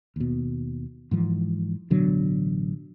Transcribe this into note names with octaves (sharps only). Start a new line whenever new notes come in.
D#2 B2
G#2 E3 F3
A1 B2 D3 F#3